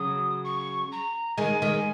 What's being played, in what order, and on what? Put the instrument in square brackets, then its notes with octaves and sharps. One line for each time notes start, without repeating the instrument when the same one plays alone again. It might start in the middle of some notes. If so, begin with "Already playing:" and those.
Already playing: [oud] C#3 F#3 [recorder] D#6
[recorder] C#6
A#5
[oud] D#3 G#3 [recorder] G#5
[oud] D#3 G#3